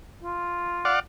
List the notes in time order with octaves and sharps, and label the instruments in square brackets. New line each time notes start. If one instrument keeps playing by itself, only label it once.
[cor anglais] F4
[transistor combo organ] D5 F5 F#5